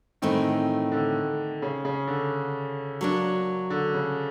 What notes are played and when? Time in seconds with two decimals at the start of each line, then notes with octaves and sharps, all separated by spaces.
0.22 A2 D#3 E3 A3 C4
0.92 D3
1.62 C#3
1.85 C#3
2.07 D3
3.01 F#3 A#3 D4
3.70 D3
3.94 C#3